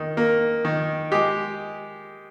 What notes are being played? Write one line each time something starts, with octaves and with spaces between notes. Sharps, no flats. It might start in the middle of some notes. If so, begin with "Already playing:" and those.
Already playing: D#3
A#3
D#3
G#3 G4